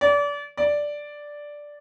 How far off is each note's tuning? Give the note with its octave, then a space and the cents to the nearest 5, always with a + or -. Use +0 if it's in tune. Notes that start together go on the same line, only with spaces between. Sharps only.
D5 -30
D5 +0